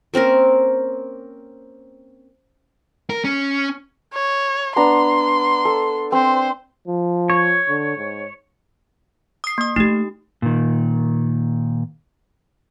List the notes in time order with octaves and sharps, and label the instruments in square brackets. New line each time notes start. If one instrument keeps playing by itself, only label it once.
[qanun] A#3 C4 C#4 A#4
[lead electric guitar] A#4
C#4
[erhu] C#5
[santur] B3 D4 A#5 [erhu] C6
[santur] A4
[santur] C4 [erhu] C5
[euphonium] F3
[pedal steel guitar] C#5
[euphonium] D3
G#2
[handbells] D#6 C7
A#3 D#6
[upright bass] A3 [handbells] D#4 G4
[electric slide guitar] A#2 D#3